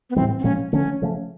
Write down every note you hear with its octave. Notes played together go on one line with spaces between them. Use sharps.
B3
A2 E3 G3 C4
C4
A#2 F3 G#3 C#4
D3 F3 A3 C#4
C#3 F3 A3 C#4